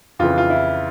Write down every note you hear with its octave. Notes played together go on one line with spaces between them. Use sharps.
F2 C#3 E3 F4
F4
E4